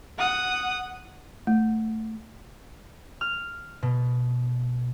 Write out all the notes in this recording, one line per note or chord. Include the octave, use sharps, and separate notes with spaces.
F#5 D#6
A3
F6
B2